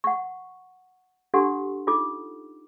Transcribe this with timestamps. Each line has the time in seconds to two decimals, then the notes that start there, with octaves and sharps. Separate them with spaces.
0.04 F#5 C#6
1.34 D4 G4 A4 F#5 C6 C#6
1.87 D#4 F4 A4 D6